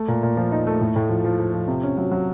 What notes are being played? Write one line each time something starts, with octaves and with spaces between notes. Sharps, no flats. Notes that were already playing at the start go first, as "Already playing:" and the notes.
Already playing: A3
A#2
A#2
F3
D#4
A3
A2
A2
F3
F3
F3
F3
C3
C#4
F#3
F#3